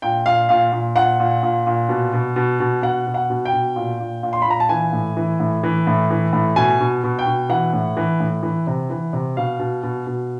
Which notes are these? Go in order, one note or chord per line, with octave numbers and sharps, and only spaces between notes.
A#2 G5
A#2 F5
A#2 F5
A#2
A#2 F#5
A#2
A#2
A#2
B2
B2
B2
B2
B2 F#5
B2
F#5
B2
G5
B2
A#2
A#2
A#2
C6
B5
A#2 A#5
A5
E3 G#5
A2
E3
A2
E3
A2
E3
A2
B2 G#5
B2
B2
G5
B2
E3 F#5
A2
E3
A2
E3
C3
E3
C3
B2 F5
B2
B2
B2